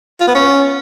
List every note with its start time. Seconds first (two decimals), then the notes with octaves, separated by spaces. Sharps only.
0.20 F4
0.28 B3
0.35 C#4